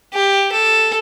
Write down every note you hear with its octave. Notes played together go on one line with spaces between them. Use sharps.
G4
A4